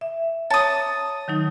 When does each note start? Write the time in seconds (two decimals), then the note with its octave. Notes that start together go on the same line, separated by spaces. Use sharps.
0.01 E5
0.50 C#5 A5 D#6 A6
1.28 D#3 F#3 D#4